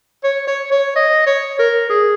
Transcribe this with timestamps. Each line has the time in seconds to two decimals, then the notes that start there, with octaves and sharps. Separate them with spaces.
0.24 C#5
0.48 C#5
0.72 C#5
0.96 D#5
1.27 C#5
1.59 A#4
1.90 G#4